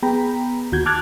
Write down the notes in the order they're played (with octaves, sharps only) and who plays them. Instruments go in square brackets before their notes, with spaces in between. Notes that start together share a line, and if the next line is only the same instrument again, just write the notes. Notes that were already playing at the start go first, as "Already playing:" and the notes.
[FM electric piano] B3 G#4 G5 A#5 B5
D#2 D#3 F#4 G6 G#6
A5 D6 F6 F#6 G#6 A6